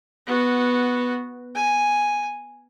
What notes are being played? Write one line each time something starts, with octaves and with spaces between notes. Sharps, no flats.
B3 F#4
G#5